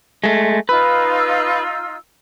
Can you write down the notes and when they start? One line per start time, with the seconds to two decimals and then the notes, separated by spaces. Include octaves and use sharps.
0.24 G#3 A3
0.69 D#4 F4 B4 E6